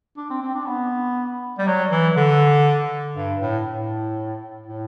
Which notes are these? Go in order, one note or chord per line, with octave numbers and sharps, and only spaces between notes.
D4
C4
C4
D4
B3
G3
F#3
E3
D3
G2
A2
A2
A2